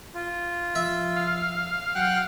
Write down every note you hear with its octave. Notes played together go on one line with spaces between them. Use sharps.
F4
F3 E5
F5
F#3 F#5 G5 F#6